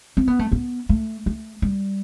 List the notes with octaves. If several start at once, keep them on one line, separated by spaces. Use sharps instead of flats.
C4
B3
A3
B3
A3
A3
G3